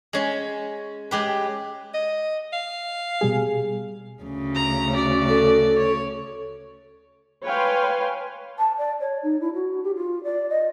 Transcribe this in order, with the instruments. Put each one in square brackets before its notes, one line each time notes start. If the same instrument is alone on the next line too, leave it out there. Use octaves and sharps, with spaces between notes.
[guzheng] G#3 C#4
G#3 G4 B4
[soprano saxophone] D#5
F5
[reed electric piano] B2 G3 G#4
[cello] D2 C#3
[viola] A#5
F#4 D5
[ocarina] A4
[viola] C#5
[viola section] B4 C#5 F5 G5 G#5 C6
[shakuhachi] A5
D5
C#5
D#4
E4
F#4
G4
F4
D5
D#5